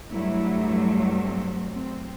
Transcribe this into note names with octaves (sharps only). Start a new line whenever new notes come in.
G2 F#3 A3 E4
C4
C4